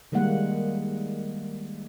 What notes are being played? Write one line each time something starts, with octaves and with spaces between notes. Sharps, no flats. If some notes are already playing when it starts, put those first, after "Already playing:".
D#3 G3 G#3 A#3 F#5